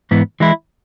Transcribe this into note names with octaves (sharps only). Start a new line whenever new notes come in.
G#2 E3 B3
E3 G#3 E4